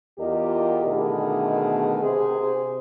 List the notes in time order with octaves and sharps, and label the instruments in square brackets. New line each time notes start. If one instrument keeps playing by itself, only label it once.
[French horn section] E2 F4 G4 A#4 D5 D#5
B2 D3 D#3 A3 B3 G#4
C3 G#4 C5